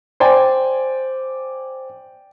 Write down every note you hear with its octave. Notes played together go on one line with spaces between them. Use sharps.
C5 D5 G5 G#5